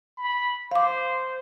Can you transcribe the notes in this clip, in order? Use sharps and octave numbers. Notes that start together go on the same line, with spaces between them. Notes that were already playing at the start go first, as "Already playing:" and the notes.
B5
C5 F5 D6